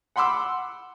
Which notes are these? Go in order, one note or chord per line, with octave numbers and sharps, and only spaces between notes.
F#5 B5 C6 D6 E6